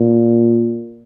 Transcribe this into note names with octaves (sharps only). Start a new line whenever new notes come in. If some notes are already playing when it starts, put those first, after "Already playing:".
Already playing: A#2